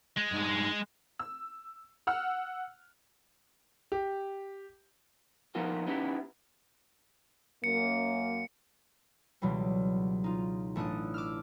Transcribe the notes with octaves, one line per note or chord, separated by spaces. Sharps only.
G#3
G2 D#4
E6
F#5 E6 F6
G4
F3 B3 D#4 F4 F#4 A#4
B3 C#4 D#4 E4 G4
F#2 A#3 C#7
C#2 B2 E3 F#3 G3
D#4 F4
A1 A3 D4 D#6 F#6
D6 E6 F6